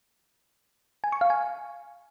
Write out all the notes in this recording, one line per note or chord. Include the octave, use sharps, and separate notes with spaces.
G#5
C#6
F5
G#5